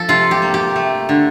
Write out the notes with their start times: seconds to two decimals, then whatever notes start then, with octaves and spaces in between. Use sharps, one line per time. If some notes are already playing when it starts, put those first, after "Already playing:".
Already playing: F3 A4
0.09 C3 F4
0.31 G4
0.42 A#3
0.54 G4
0.76 A3
1.09 D3